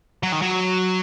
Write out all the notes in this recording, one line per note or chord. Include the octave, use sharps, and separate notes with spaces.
F#3
D#3
F#3